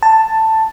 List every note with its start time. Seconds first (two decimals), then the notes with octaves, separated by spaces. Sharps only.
0.03 A5